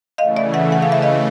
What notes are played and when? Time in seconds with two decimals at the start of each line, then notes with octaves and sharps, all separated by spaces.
0.18 C#3 E3 A3 D#5 F5
0.36 D5 E5
0.54 E5 F#5
0.72 F#5
0.82 F5
0.92 E5
1.02 D#5 F5